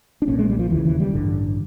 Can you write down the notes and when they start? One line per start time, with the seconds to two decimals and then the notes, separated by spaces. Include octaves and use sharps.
0.22 D4
0.28 B1 A#2 C#4
0.39 G#3
0.50 G3
0.59 F3
0.70 E1 D#2 C#3 E3
0.85 E3
1.00 G3
1.14 A1 G2 D3